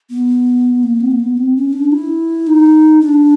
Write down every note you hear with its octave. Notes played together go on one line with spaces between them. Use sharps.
B3
A#3
C4
A#3
B3
C4
C#4
D4
E4
D#4
D4